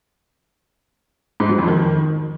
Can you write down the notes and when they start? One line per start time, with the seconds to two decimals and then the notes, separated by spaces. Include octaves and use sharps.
1.40 G#2
1.49 F#3
1.59 F2
1.68 D#3